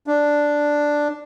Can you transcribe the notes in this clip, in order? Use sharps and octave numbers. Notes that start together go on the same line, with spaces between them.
D4